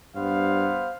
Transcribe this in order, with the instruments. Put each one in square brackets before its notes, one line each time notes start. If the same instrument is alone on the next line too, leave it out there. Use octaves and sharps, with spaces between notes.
[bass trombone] G2 [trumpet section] B3 C5 F5